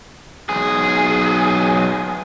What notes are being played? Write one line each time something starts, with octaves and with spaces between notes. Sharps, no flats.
B1 G#4